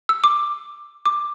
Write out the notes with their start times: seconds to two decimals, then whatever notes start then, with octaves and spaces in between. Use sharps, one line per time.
0.09 E6
0.24 D6
1.06 D6